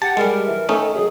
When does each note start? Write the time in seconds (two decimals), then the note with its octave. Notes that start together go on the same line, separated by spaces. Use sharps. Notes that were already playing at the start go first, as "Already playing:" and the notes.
0.02 G4 F#5 A5
0.17 G3 G#3 G4 A#4
0.47 E3
0.69 D#3 A3 C#4 D#4 A4
0.94 F#2 G#4